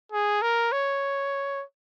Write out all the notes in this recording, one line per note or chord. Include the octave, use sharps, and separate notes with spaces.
G#4
A#4
C#5